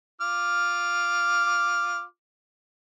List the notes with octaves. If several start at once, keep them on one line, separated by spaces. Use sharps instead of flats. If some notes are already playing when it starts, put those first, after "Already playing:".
F4 D6 F6